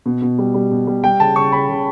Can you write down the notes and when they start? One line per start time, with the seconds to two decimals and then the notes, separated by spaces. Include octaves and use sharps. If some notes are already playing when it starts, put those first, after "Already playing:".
0.06 B2
0.22 B2
0.39 G3
0.54 G3
0.71 B2
0.87 G3
1.03 G3 G5
1.20 C#3 A5
1.36 C#3 C#6
1.52 C#3 B5
1.69 C#3